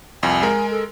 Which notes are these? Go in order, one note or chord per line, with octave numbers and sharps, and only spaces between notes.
C2 F2 G#5
G#3 A#4
A4